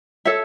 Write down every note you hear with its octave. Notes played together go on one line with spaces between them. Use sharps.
A4 C#5 E5